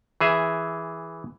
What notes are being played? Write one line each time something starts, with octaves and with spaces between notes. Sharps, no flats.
E3 G#4 E5